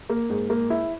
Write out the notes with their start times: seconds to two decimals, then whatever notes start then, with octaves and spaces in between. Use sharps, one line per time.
0.10 A#3
0.30 G#2
0.50 A#3
0.70 E4